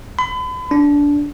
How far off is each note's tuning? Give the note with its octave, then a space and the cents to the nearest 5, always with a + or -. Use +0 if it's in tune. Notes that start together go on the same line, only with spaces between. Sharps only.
B5 +40
D4 -20